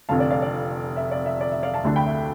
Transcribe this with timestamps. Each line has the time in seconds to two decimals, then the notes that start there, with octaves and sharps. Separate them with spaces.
0.09 F1 F2 D3 F5 A5
0.19 D5 F5
0.30 D5 F5
0.42 D5
0.96 E5
1.11 D5
1.26 E5
1.41 D5
1.52 E5
1.63 D5 F5
1.74 F5 A5
1.84 D2 D3 A3 D4
1.96 G5 B5
2.06 E5